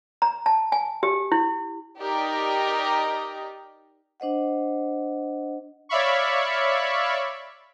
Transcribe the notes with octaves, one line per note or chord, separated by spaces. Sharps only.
A#5
A5
G#5
G4
E4
D#4 G4 A#4 D5 D#5
D4 C5 D#5 F#5
C#5 D5 E5 F5 B5 C#6